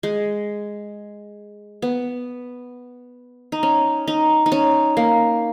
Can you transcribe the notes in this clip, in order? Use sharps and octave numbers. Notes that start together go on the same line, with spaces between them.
G#3
B3
D#4
C#4
D#4
D#4
C#4
A#3